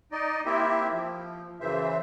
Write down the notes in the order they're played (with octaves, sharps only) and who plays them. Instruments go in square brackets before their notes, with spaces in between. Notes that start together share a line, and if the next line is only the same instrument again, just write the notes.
[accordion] D#4 D5 D#5
A#3 C4 E4 G4 E5
F3
F#2 C#3 E3 C5 E5